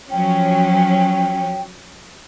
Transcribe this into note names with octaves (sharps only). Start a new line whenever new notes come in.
F3 F#3 C#4 G5